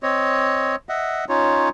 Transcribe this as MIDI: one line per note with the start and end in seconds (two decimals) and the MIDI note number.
0.03 0.76 60
0.03 0.76 73
0.03 0.76 75
0.89 1.25 75
0.89 1.25 76
0.89 1.25 78
1.29 1.69 61
1.29 1.69 63
1.29 1.69 65
1.29 1.69 73